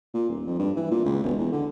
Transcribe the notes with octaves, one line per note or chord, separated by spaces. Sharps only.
A#2
D#1
F2
G2
E3
A#2
C#2
E1
E2
D3